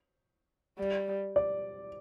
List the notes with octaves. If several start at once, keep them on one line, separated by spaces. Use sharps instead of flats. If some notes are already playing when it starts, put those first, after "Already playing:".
G3
D5